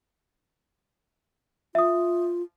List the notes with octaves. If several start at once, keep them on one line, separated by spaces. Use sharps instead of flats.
F4 E5 D#6